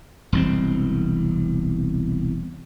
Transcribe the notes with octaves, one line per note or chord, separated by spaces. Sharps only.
E1 C2 C4